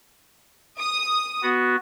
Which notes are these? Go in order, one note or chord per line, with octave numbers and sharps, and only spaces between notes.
D#6
B3 F#4